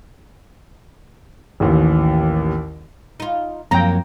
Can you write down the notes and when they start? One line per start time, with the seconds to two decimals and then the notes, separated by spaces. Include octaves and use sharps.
1.60 A1 D#2
3.20 D#4 F4
3.71 F#2 F3 F#3 A#3 C4 G5 A#5